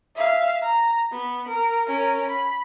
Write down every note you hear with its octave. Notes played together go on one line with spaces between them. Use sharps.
E5 F5
A#5
B3
A#4
C#4 A#4
B5